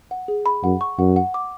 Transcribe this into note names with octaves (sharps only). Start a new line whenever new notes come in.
F#5
G#4
B5
F#2 F#5
C#6
F#2 F#5
F#5
D6